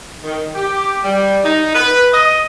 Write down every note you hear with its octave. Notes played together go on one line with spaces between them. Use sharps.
D#3
G4
G3
D#4
B4
D#5